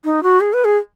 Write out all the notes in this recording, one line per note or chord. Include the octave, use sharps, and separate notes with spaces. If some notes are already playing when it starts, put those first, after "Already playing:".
D#4
F#4
G#4
B4
G#4